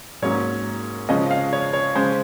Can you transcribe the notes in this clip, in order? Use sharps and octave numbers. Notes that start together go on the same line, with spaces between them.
G#2 F#3 A#3 C#4 C#5
C#3 F3 G#3 C#4 D#5
F5
C#5
C#5
C#3 G#3 C#4 C5